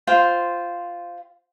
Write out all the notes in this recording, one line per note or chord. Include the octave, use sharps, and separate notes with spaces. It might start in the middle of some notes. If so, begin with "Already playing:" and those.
F4 C5 G5